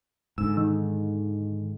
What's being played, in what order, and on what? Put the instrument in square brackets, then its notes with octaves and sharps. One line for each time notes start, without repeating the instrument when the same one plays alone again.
[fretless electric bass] G#2 D3 [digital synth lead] E6
[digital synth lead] D#3